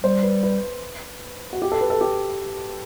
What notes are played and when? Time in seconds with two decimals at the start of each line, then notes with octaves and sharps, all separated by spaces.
0.03 G3 C5
0.23 B4
0.43 B4
1.53 F#4
1.62 G4
1.72 A4
1.81 B4
1.90 A4
2.01 G4